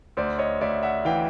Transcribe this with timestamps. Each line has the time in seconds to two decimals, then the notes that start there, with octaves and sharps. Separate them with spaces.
0.17 D2 C5 D5
0.39 C#5 D#5
0.61 D2 D5 E5
0.83 E5 F#5
1.05 E3 F5 G5